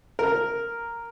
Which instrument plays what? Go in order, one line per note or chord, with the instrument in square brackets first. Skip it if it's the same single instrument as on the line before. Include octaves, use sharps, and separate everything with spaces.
[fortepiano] A#4